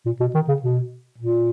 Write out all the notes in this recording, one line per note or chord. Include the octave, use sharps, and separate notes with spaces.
A#2
B2
D#3
C#3
B2
A#2